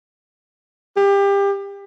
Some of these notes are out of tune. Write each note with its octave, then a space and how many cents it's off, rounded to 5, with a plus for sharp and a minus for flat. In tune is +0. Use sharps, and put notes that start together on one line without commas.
G4 +25